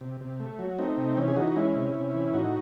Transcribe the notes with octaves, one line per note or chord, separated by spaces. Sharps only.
C3
C3
A3
F#3
A3 C4 D#4
C3
E3 C#4
G#4
E3 D#4 F#4
F#4
G#3 C#4 E4
C3
C3
E3
A2 D#4 F#4